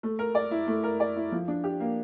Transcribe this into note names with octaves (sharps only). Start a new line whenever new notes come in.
A3
A#4
D5
E4
A3
A#4
D5
E4
F3
D4
G4
A#3